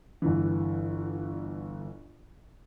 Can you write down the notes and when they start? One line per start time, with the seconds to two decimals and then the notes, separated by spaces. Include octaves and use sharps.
0.22 G1 D3 E3